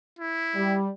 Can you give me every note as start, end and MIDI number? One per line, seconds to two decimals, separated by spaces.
0.19 0.78 64
0.55 0.88 55